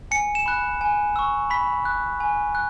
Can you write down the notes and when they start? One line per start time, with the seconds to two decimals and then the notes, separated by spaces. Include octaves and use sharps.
0.11 G#5 C#7
0.35 E7
0.46 B5 F#6
0.81 G#5
1.16 C#6 E6
1.50 B5 B6
1.85 F#6
2.20 G#5
2.55 F#6